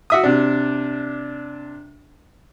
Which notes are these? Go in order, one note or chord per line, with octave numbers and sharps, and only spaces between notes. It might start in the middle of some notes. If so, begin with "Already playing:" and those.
F#4 E5 D#6
C3 D4